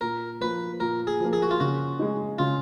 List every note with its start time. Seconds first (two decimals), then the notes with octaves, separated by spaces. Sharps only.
0.01 A#2 A#4
0.41 F3 A#3 B4
0.80 A#2 A#4
1.07 G#4
1.20 F3 A#3
1.33 G#4
1.42 F#4
1.51 F4
1.60 C#3 F#4
1.99 G#3 D#4
2.38 C#3 F4